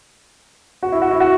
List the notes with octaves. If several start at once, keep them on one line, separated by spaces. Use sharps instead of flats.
F#4
E4
F#4
E4
F#4